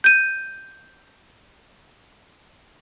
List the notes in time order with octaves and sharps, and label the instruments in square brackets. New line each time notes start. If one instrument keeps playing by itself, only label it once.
[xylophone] G6 D#7